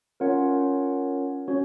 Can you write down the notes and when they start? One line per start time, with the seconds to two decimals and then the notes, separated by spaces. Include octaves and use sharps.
0.20 C#4 F4 A#4 C#5 F#5
1.48 C#4 F#4 C#5